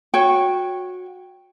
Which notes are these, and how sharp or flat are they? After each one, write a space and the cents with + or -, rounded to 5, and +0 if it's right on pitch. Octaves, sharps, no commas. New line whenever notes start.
F#4 -20 C#5 +0 G5 +0